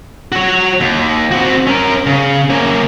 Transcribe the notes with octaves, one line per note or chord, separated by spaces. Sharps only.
F#4 C#5
D#2
C4 F#4
C#4 A#4
C#3
A#3 C#4